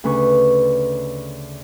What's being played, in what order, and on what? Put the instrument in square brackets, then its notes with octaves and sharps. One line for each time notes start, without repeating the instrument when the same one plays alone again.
[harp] D2 C#3 C#4 B4 C#6 D#6